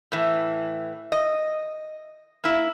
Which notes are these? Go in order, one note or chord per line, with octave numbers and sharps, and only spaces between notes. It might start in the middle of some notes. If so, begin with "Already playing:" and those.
A2 E3
D#5
A#3 E4